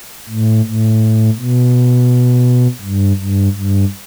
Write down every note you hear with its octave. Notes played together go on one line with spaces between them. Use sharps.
A2
A2
B2
G2
G2
G2